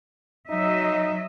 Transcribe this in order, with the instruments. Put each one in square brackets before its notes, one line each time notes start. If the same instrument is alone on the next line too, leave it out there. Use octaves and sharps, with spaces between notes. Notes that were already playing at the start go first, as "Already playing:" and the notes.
[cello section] F#3 D#5 E5 [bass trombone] D#4